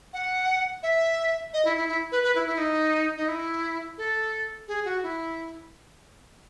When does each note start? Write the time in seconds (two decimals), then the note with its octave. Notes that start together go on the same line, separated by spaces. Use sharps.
0.13 F#5
0.83 E5
1.53 D#5
1.65 E4
1.77 E4
1.88 E4
2.12 B4
2.23 B4
2.35 E4
2.47 E4
2.58 D#4
3.17 D#4
3.28 E4
3.98 A4
4.68 G#4
4.85 F#4
5.03 E4